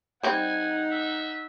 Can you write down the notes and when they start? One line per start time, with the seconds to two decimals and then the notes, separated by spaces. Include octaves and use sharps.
0.23 G3 C4 D#4 F#5 G#5
0.91 E5